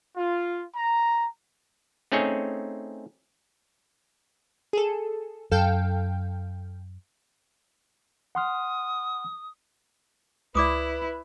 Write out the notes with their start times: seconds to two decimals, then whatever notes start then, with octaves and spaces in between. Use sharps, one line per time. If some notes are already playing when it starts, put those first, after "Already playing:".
0.17 F4
0.76 A#5
2.12 A3 C4 C#4 D#4 G#4 C#5
4.73 G#4 A4
5.52 F#2 A4 F5 G5
8.35 F#5 C6 D#6 F6
10.55 C#2 E4 B4 D5 D6 D#6